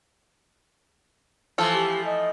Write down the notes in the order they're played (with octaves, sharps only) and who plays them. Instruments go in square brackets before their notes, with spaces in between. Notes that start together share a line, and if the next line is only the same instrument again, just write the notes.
[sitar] E3 F3 A3 [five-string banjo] F4 A4
[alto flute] G4
D#5